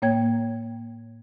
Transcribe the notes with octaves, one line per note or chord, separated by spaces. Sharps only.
A2 A#3 C#5 G5 G#6